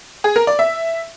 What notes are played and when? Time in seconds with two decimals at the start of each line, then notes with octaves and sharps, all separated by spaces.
0.24 G#4
0.36 A#4
0.47 D5
0.59 E5